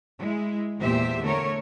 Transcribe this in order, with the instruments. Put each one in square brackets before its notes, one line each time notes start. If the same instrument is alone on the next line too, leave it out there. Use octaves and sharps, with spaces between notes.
[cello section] G#3 E4
E2 A#2 G4 C5 E5
D3 A3 A#4 C#5